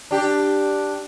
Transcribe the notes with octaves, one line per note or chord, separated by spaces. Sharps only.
D4 G4